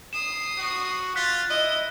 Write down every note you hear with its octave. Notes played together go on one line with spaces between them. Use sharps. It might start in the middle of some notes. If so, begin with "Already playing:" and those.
D#6 C7 E7
F#4
F4 F#6 A6 B6
E4 D#5